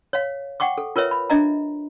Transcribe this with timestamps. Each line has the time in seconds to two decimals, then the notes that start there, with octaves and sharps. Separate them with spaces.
0.13 C#5 F5
0.60 F#5 G5 C#6 D6
0.78 A4
0.96 F4 A#4 B4 C#5 E5
1.11 B5
1.30 D4 D#5 E5 A#5